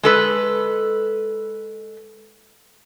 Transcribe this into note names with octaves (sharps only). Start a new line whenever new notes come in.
G#3 A4 B4